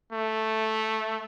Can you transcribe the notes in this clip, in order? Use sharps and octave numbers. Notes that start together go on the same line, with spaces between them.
A3